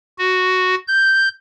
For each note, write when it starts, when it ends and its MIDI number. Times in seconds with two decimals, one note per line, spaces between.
0.18 0.75 66
0.87 1.28 91